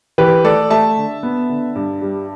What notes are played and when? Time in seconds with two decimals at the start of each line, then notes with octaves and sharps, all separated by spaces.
0.18 E3 G4 B4
0.44 A3 A4 D5
0.70 A3 E5 A5
0.96 D3
1.23 B3
1.49 D3
1.75 G2
2.01 G3